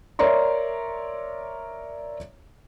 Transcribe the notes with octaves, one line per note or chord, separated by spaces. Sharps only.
A#4 C#5 D5 E5 A#5 C6